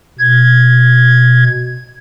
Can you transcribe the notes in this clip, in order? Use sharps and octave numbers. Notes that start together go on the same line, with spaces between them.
B2 G#6